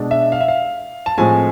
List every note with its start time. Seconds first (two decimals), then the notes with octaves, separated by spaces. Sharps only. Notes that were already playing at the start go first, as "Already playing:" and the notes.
Already playing: B2 G#3 D4
0.11 E5
0.32 F5
0.40 E5
0.48 F5
1.06 A5
1.18 A2 F3 G#3 C4 G#5